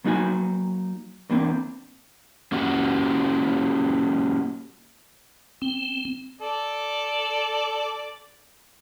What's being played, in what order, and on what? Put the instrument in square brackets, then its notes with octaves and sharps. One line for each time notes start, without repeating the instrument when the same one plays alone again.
[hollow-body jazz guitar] F#3 A#3 D#4 F#4 G#5
E2 A#3 C4 D4
[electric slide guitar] A#3 C#4 F#4 G4 F#5
[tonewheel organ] C4
[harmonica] A4 D5